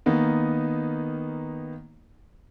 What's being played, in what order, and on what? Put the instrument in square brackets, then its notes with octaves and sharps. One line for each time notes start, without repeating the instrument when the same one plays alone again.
[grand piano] D#3 A#3 B3 D#4